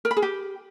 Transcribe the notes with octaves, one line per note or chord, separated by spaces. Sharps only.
A#4
B5
G#4
G4